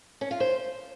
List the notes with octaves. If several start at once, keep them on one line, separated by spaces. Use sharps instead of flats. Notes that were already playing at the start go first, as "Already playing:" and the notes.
C#4
F4
C5